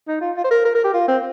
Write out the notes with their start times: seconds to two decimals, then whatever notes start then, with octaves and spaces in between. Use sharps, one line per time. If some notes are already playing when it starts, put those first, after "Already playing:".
0.08 D#4
0.21 F4
0.37 F4
0.44 C5
0.51 A#4
0.65 A#4
0.75 A#4
0.84 G4
0.94 F4
1.08 C4